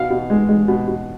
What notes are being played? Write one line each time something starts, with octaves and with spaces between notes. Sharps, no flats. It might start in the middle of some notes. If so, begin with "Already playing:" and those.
Already playing: B2 F5
B2
G#3
G#3
B2
B2